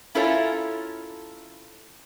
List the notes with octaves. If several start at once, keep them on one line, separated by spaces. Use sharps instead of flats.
C#4 E4 F4 A4 A#4 C#5